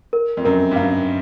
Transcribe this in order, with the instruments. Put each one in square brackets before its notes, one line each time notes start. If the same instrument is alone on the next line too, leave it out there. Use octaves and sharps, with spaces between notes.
[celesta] A#4
[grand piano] F2
[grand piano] F#2 [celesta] A#4
[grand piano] G2
[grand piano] F#2 [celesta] F5